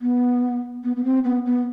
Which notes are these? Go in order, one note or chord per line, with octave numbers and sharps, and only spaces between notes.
B3
B3
B3
C4
B3
B3